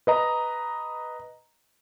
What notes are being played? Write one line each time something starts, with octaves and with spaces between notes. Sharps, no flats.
B4 D#5 A#5